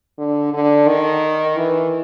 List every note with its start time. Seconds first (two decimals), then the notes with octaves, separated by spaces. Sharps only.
0.18 D3
0.53 D3
0.88 D#3
1.57 E3